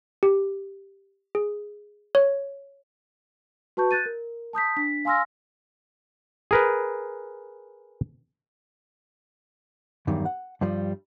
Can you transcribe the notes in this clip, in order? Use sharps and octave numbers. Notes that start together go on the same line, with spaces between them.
G4
G#4
C#5
F#4 B4 A5 C#6 G6
F#6 G6 A6 D#7
A#4
A5 D#6 G6 B6
D4 B6
F5 G#5 C6 E6 F6 A#6
G#4 A#4 B4
E2 G2 D#3 F#3
F#5
G2 F3 G3